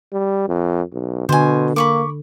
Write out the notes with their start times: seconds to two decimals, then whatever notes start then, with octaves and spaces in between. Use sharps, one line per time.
0.13 G3
0.48 F2
0.92 B1
1.29 B2 D3 C5 G#5
1.76 A#3 B5 C#6 D6